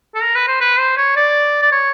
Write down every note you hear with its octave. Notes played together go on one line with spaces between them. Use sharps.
A4
A#4
B4
C5
B4
C5
C#5
D5
D5
C#5